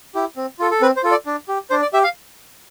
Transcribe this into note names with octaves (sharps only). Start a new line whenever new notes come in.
E4 G4
C4
F4 A4
A4
C4 B4
C5
F4 A4
D5
D4
G4
D4 C5
D5
G4 E5
F5